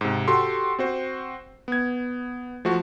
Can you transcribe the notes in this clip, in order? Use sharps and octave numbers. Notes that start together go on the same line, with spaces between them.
G#2 C3
F#4 G4 A4 C6
C4 F#4 C5
B3 G#6
F3 A3 F#4